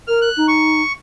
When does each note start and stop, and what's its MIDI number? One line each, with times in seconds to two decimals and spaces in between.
0.07 0.29 70
0.07 0.20 89
0.22 0.46 90
0.36 0.81 63
0.48 0.92 85